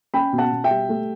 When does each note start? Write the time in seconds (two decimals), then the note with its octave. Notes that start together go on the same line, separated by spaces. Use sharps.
0.14 C#4 G5 B5
0.33 B2
0.38 F#5 A5
0.52 B2
0.64 E5 G5
0.70 G3
0.89 A3